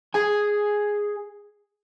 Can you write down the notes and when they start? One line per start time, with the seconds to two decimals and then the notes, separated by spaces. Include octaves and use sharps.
0.14 G#4 G#5